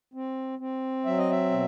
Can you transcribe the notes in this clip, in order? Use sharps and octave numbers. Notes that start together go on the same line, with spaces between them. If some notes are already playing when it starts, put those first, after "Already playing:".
C4
C4
F#3 E5
D#5
E5
B2